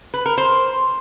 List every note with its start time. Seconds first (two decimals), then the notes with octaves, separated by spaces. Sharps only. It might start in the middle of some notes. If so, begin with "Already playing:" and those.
0.14 B4
0.26 A#4
0.38 C5